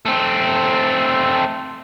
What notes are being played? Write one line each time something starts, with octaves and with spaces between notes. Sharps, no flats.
A3 C4